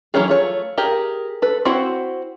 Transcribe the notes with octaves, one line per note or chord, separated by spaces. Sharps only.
E3 F#3 A3 C#4 G#4
A3 F4 C#5
G4 G#4 A#4
A4 B4
C4 E4 F#4 C5 F#5